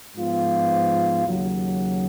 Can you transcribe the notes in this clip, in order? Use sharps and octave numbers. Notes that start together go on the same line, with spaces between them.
G#2 F3 B3 F4
D#2 C#3 F#3